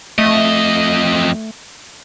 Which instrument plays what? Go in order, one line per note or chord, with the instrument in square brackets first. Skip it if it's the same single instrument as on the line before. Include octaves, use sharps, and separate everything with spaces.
[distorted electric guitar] F2 D#5 [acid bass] A3